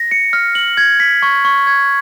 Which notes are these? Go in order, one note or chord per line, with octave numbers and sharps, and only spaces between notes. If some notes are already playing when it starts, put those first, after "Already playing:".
Already playing: A#6
C#7
F6
F#7
G#6
B6
C#6
C#6
G#6